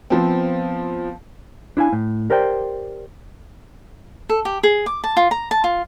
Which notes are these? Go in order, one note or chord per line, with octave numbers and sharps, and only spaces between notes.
F3 B3 C4
D4 E4 F5 G#5
A2
G4 A#4 C5 D5 G5
A4
G4
G#4
D6
A5
F4
A#5
A5
F4